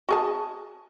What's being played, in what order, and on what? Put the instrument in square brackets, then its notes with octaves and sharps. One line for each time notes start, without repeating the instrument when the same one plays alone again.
[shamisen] F#4 G#4 A5